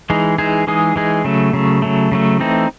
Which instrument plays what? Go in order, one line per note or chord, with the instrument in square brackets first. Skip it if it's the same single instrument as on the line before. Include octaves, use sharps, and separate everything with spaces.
[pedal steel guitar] E3 G#3 D#4 G#4
E3 G#3 D#4 G#4
E3 G#3 D#4 G#4
E3 G#3 D#4 G#4
C#3 F#3 A3
C#3 F#3 A3
C#3 F#3 A3
C#3 F#3 A3
E3 A3 C4 D#4